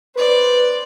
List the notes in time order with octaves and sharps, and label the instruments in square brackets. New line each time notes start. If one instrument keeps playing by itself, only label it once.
[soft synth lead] B4 [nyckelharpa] C5 D5